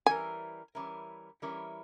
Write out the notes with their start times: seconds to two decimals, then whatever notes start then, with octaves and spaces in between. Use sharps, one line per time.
0.06 E3 G3 C#4 E4 A#4 G#5
0.75 E3 G3 C#4 E4 A#4
1.42 E3 G3 C#4 E4 A#4